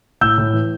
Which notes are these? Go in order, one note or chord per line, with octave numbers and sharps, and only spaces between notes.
A2 E6 G6
A2
E3